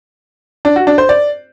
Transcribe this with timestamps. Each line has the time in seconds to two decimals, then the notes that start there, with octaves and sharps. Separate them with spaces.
0.65 D4
0.76 F#4
0.87 D4
0.98 C5
1.09 D5